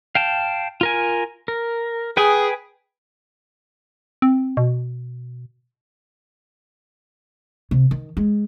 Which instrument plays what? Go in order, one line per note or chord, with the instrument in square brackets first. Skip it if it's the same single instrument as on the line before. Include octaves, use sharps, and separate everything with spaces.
[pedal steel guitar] F5 G5 A5
F4 A#4 G#5
A#4
[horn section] G#4 [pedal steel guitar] B4 G5 G#5
[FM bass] C4
B2
[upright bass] C3
D#3
G#3